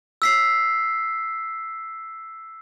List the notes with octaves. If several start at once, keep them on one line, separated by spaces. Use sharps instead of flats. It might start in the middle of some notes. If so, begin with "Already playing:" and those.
E6 B6 C7